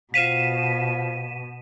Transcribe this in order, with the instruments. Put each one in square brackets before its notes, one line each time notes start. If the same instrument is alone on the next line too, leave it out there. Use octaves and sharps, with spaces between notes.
[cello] B2 [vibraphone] F4 C5 F5 [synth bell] B6 D#7 E7